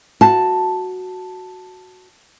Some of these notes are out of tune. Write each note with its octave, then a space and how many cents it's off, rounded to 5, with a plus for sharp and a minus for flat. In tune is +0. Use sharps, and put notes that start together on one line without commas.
F#4 -5 A5 +0